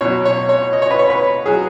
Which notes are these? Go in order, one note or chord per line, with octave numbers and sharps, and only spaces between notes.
B2 F#3 C#5
C#5
C#5
D#5
C#5
B4
C#5
B4
F#3 G#4